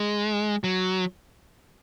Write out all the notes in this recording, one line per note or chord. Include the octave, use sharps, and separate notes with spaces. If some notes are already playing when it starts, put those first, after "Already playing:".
Already playing: G#3
F#3